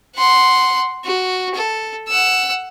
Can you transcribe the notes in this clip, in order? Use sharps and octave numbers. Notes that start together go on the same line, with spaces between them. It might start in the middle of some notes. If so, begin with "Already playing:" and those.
F#5 C6
F#4
A4
F#5 E6